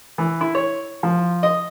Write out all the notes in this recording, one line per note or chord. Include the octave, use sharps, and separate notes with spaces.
E3
E4
C#5
F3
D#5